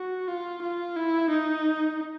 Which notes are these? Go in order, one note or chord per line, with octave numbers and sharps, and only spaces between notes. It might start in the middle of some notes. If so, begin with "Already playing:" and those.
Already playing: F#4
F4
F4
E4
D#4